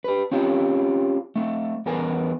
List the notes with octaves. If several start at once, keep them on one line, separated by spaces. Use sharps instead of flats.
G4 B4
C4 C#4 F4 G4
A3 C4
E2 B3 A#4 G#5